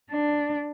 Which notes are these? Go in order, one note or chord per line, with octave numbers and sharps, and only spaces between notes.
D4